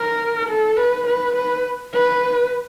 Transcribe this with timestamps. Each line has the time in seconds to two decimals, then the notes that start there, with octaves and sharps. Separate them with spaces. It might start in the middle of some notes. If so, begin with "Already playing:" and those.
Already playing: A#4
0.49 A4
0.77 B4
1.07 B4
1.35 B4
1.94 B4